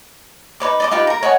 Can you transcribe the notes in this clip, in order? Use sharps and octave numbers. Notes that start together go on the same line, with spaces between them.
D#4 B4 C#5 D6
D5 D#5 D6
D#4 F4 G4 B4
A#4 A#5
C#5 D#5 F#5 G#5